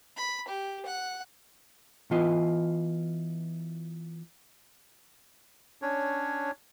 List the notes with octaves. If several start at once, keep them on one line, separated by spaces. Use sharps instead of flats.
B5
G4
F#5
E3 B3 F4 D#5
C#4 D4 C#5